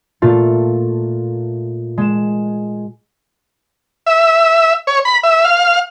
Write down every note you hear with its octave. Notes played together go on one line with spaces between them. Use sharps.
A#2 A3 F4
G#3 E7
E5
C#5
B5
E5
F5